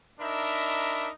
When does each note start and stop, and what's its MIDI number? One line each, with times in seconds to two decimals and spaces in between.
0.20 1.10 62
0.20 1.10 63
0.20 1.10 70
0.20 1.10 76
0.20 1.10 83